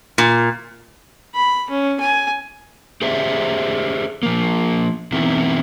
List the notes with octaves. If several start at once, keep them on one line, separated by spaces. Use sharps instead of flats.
A#2
B5
C#4
G#5
G4 G#4 C5 D5 E5
F3 A#3
B2 D#3 E3 C4 E4